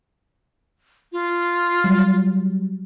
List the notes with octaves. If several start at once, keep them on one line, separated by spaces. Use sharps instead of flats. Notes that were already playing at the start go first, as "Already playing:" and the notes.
F4
F#3 G3